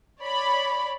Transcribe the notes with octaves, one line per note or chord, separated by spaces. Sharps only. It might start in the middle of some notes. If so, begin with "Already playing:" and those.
C#5 D5 B5